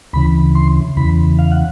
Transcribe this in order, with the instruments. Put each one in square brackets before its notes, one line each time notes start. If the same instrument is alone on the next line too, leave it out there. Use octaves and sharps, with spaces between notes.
[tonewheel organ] D2 C#3 E3 B5
C6
E2 C#3 E3 B5
F5
F#5